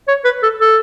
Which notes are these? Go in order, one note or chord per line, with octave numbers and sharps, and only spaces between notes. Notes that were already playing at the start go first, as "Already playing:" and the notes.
C#5
B4
A4
A4